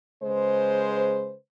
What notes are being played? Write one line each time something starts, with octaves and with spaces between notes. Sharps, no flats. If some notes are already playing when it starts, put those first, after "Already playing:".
C#3 G#3 B4 C5